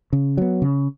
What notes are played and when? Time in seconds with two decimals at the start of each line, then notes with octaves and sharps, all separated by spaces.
0.13 C#3
0.37 F#3 B3
0.62 C#3